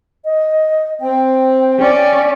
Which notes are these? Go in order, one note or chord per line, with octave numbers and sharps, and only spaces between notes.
D#5
C4 G5
C#4 D5